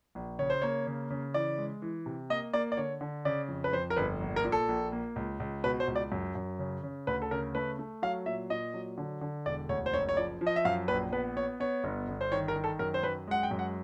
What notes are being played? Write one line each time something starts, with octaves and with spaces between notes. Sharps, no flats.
A#1
C#3 C#5
C5
A#3 C#5
C#3
C#3
E3 D5
G#3
E3
C3
A#3 D#5
A#3 D5
D5
D3 C#5
D3
C#3 D5
F2
B4
F2 C5
A#4
G1 B4
A#1
A#4
A#2
A4
A#1
A#3
C#2
C#2
B2 B4
C5
C#2
D5
F#2
F#2
C#3
C#3
D2 B4
A4
C#3 A#4
A3 B4
A3
F#3 F5
A#2 E5
A#2 D#5
F#3
D3
D3
E1 D5
D2 C#5
C5
F#1 C#5
C#5
F3 D5
F3
D#5
E5
F#2 F5
A#1 B4
B3 B4
B3 C#5
B3 C#5
G1
G1
C5
D#3 C#5
A#4
D#3
A4
F#2 A#4
C5
F#2 B4
G#3 F#5
G5
F#2
F#5